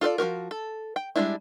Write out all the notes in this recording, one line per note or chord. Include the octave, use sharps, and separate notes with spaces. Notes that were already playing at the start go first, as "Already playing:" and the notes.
F4 A4 C5 D5
F3 A#3 F#4 A#4
A4
G5
G3 G#3 C#4 D4 E4